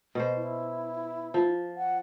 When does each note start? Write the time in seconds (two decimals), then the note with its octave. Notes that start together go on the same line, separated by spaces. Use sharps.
0.15 B2 C5
0.37 E4
1.34 F3
1.77 F#5